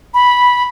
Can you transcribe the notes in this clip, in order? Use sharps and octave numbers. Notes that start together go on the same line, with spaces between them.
B5